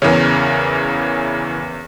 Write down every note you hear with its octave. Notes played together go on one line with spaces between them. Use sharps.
E2 C#3 E3 C#4 A#4